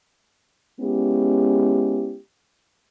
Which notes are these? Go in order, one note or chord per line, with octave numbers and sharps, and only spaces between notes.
G#3 B3 C#4 E4 G4